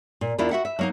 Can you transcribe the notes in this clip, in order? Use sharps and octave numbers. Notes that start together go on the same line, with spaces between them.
A#2
E2 A#3 D4 E4 F4
F#4 E5 F#5
E5
F#3 A#3 D#4